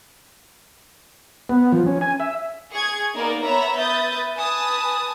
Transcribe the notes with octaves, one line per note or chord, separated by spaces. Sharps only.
B3
F3
C#4
G#5
E5
G#4 C#6 G#6
A#3 B3 D#4 A#4 D5
B3 C#5 E5 A#5 B5 E6
B4 E5 D#6 G6 A6
B4 G#5 A5 D#6